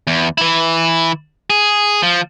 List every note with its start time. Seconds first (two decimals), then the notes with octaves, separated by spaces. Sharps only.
0.07 E2
0.38 E3 E4
1.50 G#4
2.03 F3